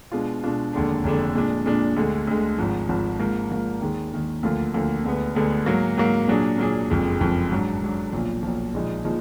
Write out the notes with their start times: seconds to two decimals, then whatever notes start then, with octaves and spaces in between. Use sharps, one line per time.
0.12 B2 G#3 D4 F4
0.43 B2 G#3 D4 F4
0.73 F1 D#2 D3 G#3 D4
1.04 F1 D#2 D3 G#3 D4
1.35 A#2 G#3 D4
1.66 A#2 G#3 D4
1.97 D2 D3 G#3
2.27 D2 D3 G#3
2.58 G#1 G#2 F3
2.89 G#1 G#2 F3
3.19 G#2 F3 A#3
3.51 G#2 F3 A#3
3.81 D#2 D#3 G#3
4.12 D#2 D#3 G#3
4.43 D2 D3 F3 A#3 F4
4.74 D2 D3 F3 A#3 F4
5.05 D2 D3 G#3 B3
5.35 D2 D3 G#3 B3
5.66 G#2 F#3 A#3
5.97 G#2 F#3 A#3
6.28 A#2 F#3 D4 G#4
6.58 A#2 F#3 D4 G#4
6.90 F#1 F2 F3 G#3
7.20 F#1 F2 F3 G#3
7.51 G#2 F#3 D4
7.82 G#2 F#3 D4
8.12 B1 A#2 F3
8.43 B1 A#2 F3
8.74 A#1 A#2 F3 G#3 D#4
9.04 A#2 F3 G#3 D#4